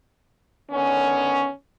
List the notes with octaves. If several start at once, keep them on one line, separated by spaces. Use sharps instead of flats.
D3 D#3 B3 C#4